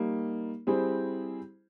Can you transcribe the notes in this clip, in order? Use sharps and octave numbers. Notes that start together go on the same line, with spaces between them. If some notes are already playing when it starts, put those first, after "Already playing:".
Already playing: G3 A#3 D#4
G3 C4 E4 G#4 C5